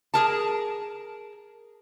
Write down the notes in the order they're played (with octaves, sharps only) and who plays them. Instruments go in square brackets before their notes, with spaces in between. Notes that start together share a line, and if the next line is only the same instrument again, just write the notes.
[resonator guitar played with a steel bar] G#4 A#4 A5